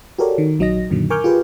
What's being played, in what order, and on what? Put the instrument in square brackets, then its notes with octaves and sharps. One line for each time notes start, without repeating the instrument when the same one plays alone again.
[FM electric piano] F#4 G4 A4 A#4 C#5 D5
D#3
A#1 F#3 D#4 D#5 A#6
F#2 A#2 D3 D#3 F#3
A#4 G#5 C#6 D6 F6 G6
F4 G4 G#4 B4